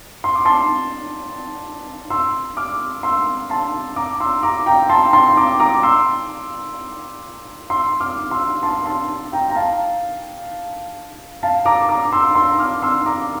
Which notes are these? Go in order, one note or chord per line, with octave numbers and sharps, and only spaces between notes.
C6
D6
A5 C6
C6 E6
D6 F6
C6 E6
A5 C6
A#5 D6
C6 E6
A#5 D6
G5 A#5
A5 C6
A5 C6
A#5 D6
A#5 D6
C6 E6
C6 E6
D6 F6
C6 E6
A5 C6
A5 C6
G5 A#5
A#5
F5 A5
F5 A5
A#5 D6
A#5 D6
C6 E6
C6 E6
D6 F6
C6 E6
A#5 D6